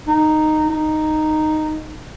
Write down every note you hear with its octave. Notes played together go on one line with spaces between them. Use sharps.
D#4
D#4